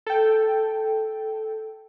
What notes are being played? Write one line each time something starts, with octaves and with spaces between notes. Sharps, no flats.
A4 G5